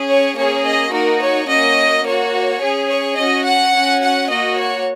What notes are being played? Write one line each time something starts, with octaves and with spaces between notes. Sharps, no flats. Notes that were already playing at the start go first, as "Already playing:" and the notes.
Already playing: C#4 G#4
C#5
A#3 C#4 G#4 C#5
D#5
A#3 D#4 F#4 A#4
C#5
A#3 C#4 F#4 D#5
A#3 F#4 C#5
C#4 G#4
C#5
C#4 F#4 D#5
F#5
C#4 F#4
F#5
A#3 F#4 D#5
C#5